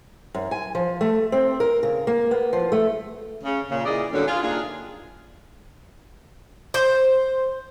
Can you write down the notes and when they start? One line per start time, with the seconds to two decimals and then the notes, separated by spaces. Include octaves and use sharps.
0.34 F#2
0.51 G#5
0.75 F3
1.01 A3
1.32 C4
1.60 A#4
1.83 C#3
2.07 A#3
2.31 B3
2.53 F3
2.72 A3
3.43 C#3
3.69 A#2 C#3
3.85 A#2 E3 G#4 D5 D#5
4.12 A2 D3 F#3 G3 A#3 C#4
4.26 F4 G#4
4.42 C3 A#3 D4 D#4 F4 G#4
6.74 C5